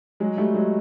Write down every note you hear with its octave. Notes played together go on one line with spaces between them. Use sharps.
F#3 G#3
G3 A3
F#3 G#3